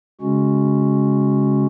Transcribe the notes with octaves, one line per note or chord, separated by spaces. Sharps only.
C#3 G#3 C#4 F#4